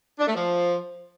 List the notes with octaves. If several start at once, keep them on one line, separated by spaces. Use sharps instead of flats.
D4
A3
F3